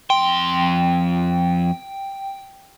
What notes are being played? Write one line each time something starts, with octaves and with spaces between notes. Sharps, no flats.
F2 G5 C6